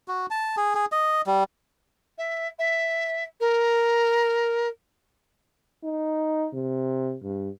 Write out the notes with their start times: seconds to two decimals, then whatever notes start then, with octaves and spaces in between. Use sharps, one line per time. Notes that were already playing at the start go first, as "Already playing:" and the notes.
0.08 F#4
0.30 A5
0.57 G#4
0.75 G#4
0.92 D#5
1.27 G3
2.18 E5
2.59 E5
3.40 A#4
5.84 D#4
6.54 C3
7.23 G2